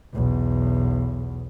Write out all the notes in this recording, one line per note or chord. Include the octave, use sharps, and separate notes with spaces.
B1 E2